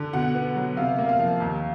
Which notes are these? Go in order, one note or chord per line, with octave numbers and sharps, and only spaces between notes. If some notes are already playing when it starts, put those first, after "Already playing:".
Already playing: D3
B2 F#5
B3
F#3
C3 F5
A#3
F5
F3
D#2